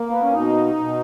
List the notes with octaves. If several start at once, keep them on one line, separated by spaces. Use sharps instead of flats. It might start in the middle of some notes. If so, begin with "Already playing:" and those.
Already playing: A#3
B3
C#4
B2 D#4
B2